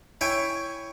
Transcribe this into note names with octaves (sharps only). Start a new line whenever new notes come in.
E4 C#5 G5 G#5